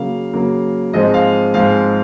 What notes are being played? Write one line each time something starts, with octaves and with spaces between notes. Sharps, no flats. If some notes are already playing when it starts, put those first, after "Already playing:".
Already playing: C#3 F#3 A#3 F5
C#3 F#3 A#3
G#2 F3 G#3 C4 D#5
F5
G#2 F3 G#3 C4 F5